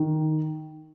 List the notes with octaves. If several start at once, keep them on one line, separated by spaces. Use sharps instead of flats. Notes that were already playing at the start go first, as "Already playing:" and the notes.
Already playing: D#3